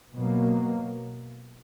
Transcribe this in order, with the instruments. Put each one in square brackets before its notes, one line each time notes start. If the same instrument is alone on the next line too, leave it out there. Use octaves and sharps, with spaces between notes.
[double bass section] B2 F#3 A#3